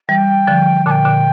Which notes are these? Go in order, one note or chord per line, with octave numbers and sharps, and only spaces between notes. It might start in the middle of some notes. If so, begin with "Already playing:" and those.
E3 G3 G5
D3 F3
A#2 D3 G5 A5
A#2 D3